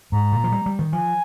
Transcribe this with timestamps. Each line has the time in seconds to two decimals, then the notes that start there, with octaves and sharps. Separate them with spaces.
0.12 G#2 A#5
0.32 A#2
0.44 F3
0.52 G3
0.66 G3
0.79 D#3
0.93 F3 G#5